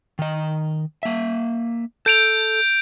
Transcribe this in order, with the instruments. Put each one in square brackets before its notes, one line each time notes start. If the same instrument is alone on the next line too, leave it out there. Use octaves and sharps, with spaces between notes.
[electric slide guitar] D#3 D#5
A#3 E5
[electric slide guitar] A4 [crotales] G6 D7 F7